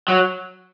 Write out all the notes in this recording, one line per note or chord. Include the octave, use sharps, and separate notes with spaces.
F#3